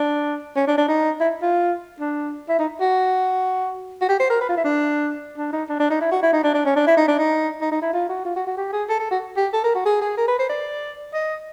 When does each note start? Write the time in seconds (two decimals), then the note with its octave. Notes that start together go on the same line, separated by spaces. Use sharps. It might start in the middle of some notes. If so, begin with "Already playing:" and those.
Already playing: D4
0.56 C#4
0.67 D4
0.78 D4
0.88 D#4
1.20 E4
1.42 F4
2.00 D4
2.49 E4
2.59 D#4
2.81 F#4
4.02 F#4
4.09 G4
4.20 C5
4.30 A#4
4.41 B4
4.49 F4
4.57 E4
4.64 D4
5.37 D4
5.53 D#4
5.69 D4
5.80 D4
5.90 D#4
6.01 E4
6.12 F#4
6.23 E4
6.33 D#4
6.44 D4
6.54 D4
6.65 C#4
6.76 D4
6.87 E4
6.97 D#4
7.08 D4
7.19 D#4
7.61 D#4
7.72 D#4
7.82 E4
7.93 F4
8.09 F#4
8.25 F4
8.36 F#4
8.47 F#4
8.57 G4
8.73 G#4
8.89 A4
9.00 A4
9.11 F#4
9.37 G4
9.53 A4
9.64 A#4
9.75 F#4
9.86 G#4
10.01 G#4
10.18 A#4
10.28 B4
10.39 C5
10.49 D5
11.14 D#5